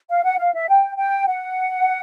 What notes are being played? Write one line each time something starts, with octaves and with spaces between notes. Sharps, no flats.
F5
F#5
F5
E5
G5
G5
F#5